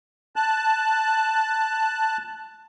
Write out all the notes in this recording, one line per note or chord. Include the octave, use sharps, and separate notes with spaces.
A5 F#6